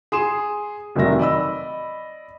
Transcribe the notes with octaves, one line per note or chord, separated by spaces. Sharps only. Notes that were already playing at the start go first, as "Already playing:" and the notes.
G#4 C6 E7
F1 D#3 F#3 E5 A#6
D5 D#5 B5 E6